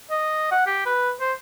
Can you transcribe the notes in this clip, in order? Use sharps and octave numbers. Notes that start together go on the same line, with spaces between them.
D#5
F#5
G4
B4
C5